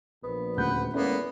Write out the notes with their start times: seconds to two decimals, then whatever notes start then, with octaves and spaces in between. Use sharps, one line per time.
0.23 A#1 B3
0.57 D#1 D2 B4 F#5 G6
0.94 E2 G#3 A#3 B3 C#4 A4 B5